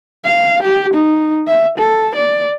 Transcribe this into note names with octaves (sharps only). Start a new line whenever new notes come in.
F5
G4
D#4
E5
A4
D5